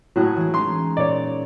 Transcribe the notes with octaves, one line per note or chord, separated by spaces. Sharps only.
A2 F#3 G#5 D#6 F#6
E3 G#3 G#4
G#3 C#4 D#4 C6
A#2 C#5 D5